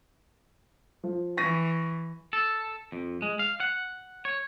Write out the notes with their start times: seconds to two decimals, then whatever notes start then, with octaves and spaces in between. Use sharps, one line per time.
1.03 F3
1.37 E3 C#6 A#6 D#7
2.33 A4
2.92 F2
3.22 G#3
3.39 F5
3.60 F#5
4.25 C#5